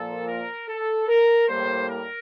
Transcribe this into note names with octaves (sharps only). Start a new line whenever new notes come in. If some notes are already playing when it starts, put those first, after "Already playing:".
Already playing: A#2 F3 A#3 A4
A#4
A4
A#4
A2 G3 A#3 C5
A#4